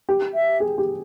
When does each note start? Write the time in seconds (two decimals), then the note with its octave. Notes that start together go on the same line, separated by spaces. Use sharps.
0.09 G4
0.34 E5
0.60 G#4
0.78 G4